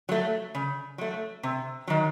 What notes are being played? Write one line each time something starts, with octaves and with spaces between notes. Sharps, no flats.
F#3 A3
C#3
F#3 A3
C3
D#3 F#3